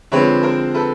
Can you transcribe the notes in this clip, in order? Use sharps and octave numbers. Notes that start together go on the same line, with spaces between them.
D3 F3 G#3 C4 B4 C#5
A#4 C5
A4 B4